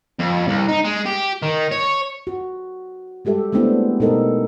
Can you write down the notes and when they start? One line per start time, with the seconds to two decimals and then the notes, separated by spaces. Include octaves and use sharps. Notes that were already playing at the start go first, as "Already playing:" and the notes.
0.19 F2
0.48 C2
0.69 D#4
0.85 G#3
1.06 G4
1.43 D#3
1.71 C#5
2.27 F#4
3.25 G3 G#3 G4 A4 E5
3.52 G#3 A3 B3 C4 D4 E4
4.00 B2 G#3 D#4 A4 A#4 D#5